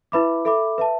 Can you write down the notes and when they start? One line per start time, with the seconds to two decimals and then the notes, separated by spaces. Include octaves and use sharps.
0.12 E4 B4 E5 B5 D6
0.45 A4 E5 B5 D6
0.78 B4 E5 A5